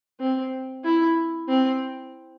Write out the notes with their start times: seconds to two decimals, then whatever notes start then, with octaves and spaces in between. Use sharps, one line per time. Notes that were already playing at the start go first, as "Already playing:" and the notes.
0.20 C4
0.84 E4
1.48 C4